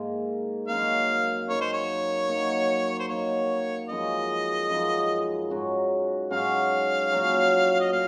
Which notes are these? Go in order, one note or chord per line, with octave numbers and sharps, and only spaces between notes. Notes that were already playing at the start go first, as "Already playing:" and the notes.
Already playing: G#2 D#3 A#3
F#2 D#3 A#3 D#4 F5
F#2 D#3 A#3 D#4 C#5
C5
C#5
F#3 A#3 D#4
C5
F#3 A#3 D#4 C#5
F#2 F3 G#3 D#4 D#5
F#2 F3 G#3 D#4
G#2 F#3 C#4 F#4
G#2 F#3 C#4 F#4 F5
A#2 F#3 C#4 F#4
D#5
A#2 F5